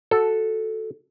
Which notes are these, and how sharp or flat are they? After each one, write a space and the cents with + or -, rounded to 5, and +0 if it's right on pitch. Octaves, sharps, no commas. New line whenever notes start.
F#4 +0 A4 +0